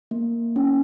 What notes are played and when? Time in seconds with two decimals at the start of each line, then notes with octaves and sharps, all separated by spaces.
0.11 A#3
0.56 C#4